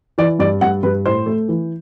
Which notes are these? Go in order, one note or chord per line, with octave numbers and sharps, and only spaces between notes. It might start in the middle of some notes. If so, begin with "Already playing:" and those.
E3 D5
G2 D5
G2 F#5
G2 B4
A2 C5
A3
E3